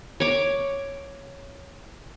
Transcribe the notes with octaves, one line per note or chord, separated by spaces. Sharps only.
C#5 D6